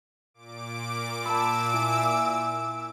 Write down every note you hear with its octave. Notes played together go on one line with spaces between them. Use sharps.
A#2 D6 D7
A5 B5 E6
E4 G#5